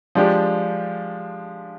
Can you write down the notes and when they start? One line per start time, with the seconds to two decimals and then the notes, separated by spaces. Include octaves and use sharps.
0.15 F3 G#3 D4 G4